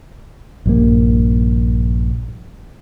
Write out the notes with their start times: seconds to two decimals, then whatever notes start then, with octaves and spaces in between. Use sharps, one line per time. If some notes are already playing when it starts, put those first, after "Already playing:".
0.66 A#1 G2 A#3